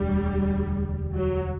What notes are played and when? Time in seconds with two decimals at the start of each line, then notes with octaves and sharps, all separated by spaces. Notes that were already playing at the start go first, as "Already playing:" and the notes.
Already playing: E1 D2 D3 G3
1.15 F#3